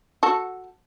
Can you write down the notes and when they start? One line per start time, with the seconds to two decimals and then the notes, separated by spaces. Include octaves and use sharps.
0.23 F#4 A4